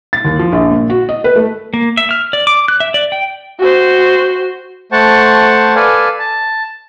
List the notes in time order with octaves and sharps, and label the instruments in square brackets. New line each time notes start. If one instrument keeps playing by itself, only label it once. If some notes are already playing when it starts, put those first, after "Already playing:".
[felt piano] A6
D#2
F3
A#1
A#2
F#4
D#5
B4
A3
[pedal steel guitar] A#3
E5
F6
D5
D6
F#6
E5
D5
G5
[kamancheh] F#4 C5
[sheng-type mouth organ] A3 C5 F#5 A5 C#6
A4 B4 D5 F5 G#5
A5